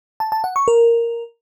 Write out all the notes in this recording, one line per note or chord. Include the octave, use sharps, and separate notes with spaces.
A5
A5
F#5
C#6
A#4